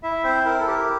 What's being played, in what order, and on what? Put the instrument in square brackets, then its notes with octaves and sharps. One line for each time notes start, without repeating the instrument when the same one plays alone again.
[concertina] E4 E5
C4 C5
E4 A#4
A4
G4 A#4